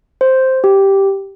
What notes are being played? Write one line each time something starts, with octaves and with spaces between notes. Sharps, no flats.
C5
G4